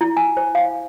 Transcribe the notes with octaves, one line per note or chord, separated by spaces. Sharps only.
E4
G#5
C5
F5